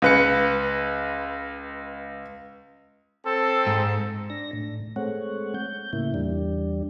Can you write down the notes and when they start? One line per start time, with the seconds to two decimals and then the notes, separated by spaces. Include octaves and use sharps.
0.02 C#2 B4 C#7
3.25 C4 A4
3.67 G#2
4.30 D4 A#6
4.53 A2
4.96 G#3 A3 C4 C#5 F#5
5.55 G6
5.93 A2 C#3 A#3 E4
6.14 E2 G3 D4